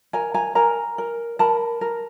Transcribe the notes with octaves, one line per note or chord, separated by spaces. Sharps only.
A#4 G#5 A#5
G#5 A#5
A#4 G#5 A#5
A#4
A#4 A5 B5
A#4